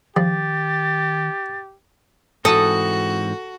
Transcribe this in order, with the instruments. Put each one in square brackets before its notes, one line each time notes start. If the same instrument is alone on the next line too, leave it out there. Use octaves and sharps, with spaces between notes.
[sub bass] D#3 [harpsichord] F3 G3 [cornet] G4 [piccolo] A6
[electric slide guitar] G#2 E3 C4 [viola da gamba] F#4 [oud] A4 [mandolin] D#6